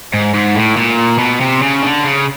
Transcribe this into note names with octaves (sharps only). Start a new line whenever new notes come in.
G#2
G#2
A2
A#2
B2
C3
C#3
D3
C#3